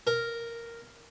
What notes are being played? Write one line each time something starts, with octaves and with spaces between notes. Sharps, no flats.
A#4